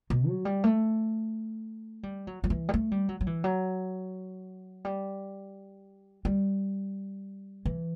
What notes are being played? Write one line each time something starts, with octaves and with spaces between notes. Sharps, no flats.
B2
F#3
G3
A3
G3
F#3
F#3
E3
G3
A3
G3
F#3
F#3
E3
F#3
G3
G3
E3